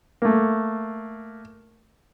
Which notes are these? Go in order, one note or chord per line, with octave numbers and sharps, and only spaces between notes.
A3 A#3